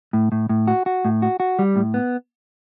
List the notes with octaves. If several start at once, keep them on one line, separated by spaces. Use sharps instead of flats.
A2
A2
A2
F#4
F#4
A2
F#4
F#4
G3
A2
B3